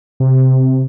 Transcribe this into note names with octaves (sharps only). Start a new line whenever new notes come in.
C3